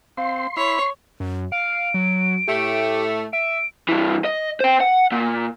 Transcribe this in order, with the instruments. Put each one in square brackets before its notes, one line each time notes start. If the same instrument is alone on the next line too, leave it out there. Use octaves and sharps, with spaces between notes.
[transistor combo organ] C4 [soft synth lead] F5 [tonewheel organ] C6
[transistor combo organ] E4 B5 [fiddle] C#5 [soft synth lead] C#6
[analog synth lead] F#2
[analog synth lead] F5 [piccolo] D7
[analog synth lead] F#3
[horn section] A2 A3 [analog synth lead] G4
[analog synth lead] E5 [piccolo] D7
[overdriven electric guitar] G2 E3
D#5
C5 G5
F#5
A#2